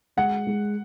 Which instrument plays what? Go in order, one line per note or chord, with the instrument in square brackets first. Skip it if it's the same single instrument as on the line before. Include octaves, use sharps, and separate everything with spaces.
[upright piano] G#3 [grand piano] F#5
[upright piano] G#3